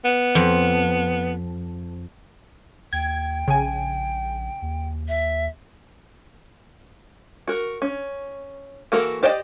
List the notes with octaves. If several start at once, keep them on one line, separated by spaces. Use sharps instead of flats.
B3
F2
D#2 G5 G#6
A#1 C#3 G#5
D#2
E5
F#4 A#4
C#4
E3 A#3 F#4 A4 A#4
G4 C5 D5 D#5 G5